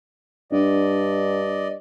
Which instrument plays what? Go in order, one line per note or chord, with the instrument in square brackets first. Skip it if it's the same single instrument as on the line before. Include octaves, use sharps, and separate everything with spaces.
[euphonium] G2 [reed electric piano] D4 [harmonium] D5 D#5